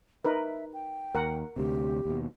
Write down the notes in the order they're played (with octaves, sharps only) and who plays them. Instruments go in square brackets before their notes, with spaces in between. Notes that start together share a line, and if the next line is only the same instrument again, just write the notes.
[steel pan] D#4 A#4 B4 [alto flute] E5
[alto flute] G5
[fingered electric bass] D#2 [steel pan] A#4 F#5
[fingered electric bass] D2 C3 [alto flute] G4
[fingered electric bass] D#2 B2